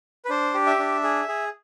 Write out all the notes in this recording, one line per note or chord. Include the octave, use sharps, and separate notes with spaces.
B4
D4 C5
G4
E5
D4
G#4
G#4